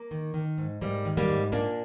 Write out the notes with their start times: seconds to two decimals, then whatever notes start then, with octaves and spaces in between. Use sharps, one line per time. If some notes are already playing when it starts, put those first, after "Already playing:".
Already playing: A#3
0.11 D#3
0.34 D#3
0.58 G#2
0.81 G#2 G3 A#3
1.05 D#3
1.17 G3 A#3
1.29 G#2
1.52 A#2 A#3 D4